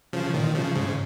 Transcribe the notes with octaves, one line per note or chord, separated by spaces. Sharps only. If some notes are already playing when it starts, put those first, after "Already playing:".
C#3 F3
A#2 D#3
C#3 F3
G#2 C#3